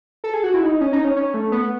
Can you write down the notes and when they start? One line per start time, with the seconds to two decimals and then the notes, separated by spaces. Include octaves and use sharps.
0.24 A4
0.34 G#4
0.44 F#4
0.54 E4
0.63 D#4
0.81 C#4
0.93 D#4
1.04 C#4
1.16 C#4
1.34 A3
1.52 B3